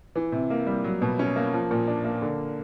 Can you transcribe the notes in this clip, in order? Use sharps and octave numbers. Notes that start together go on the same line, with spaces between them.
E3
C3
A#3
G3
F#3
B2
C#4
A#3
F3
A#2
D4
A#3
D3